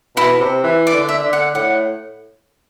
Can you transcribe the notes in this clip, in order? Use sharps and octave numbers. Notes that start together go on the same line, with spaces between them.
B2 E4
C3
E3
D5
D3
E5
D3
F#5
A2 F#5